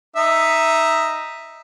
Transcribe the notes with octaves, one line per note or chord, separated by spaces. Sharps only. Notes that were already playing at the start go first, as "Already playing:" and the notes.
D#4 E5